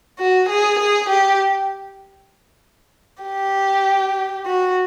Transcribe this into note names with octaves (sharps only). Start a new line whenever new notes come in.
F#4
G#4
G#4
G4
G4
F#4